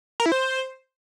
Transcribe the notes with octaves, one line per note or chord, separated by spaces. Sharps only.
A#4
E4
C5